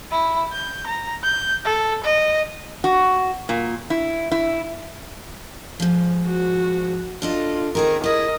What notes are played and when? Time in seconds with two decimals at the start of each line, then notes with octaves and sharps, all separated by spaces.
0.11 E4
0.52 G6
0.86 A#5
1.23 G6
1.64 A4
2.04 D#5
2.84 F#4
3.49 A#2
3.90 E4
4.32 E4
5.80 G#2 F3
6.26 F#4
7.22 D4 F4 A4 D#5
7.75 D#3 C4 G#4 A#4
8.04 E4 G#4 A#4 D#5